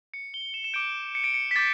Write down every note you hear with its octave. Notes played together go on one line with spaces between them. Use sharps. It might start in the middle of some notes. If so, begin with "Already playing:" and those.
C#7
G7
E7
E7
D6 G6 D7
C#7
D7
C#7
B6
D6 G6 A6